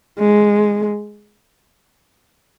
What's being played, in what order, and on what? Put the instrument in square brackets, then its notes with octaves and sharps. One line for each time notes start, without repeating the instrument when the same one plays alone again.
[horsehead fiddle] G#3